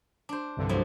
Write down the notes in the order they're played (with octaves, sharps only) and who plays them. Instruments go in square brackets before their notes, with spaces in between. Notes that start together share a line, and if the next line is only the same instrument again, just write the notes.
[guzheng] D4 C5
[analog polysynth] C2 G2 D3
[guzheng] F3 F#3 A3